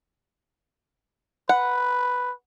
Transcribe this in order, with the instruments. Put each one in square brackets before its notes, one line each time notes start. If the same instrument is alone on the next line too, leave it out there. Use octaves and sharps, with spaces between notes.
[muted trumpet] B4 [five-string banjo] F#5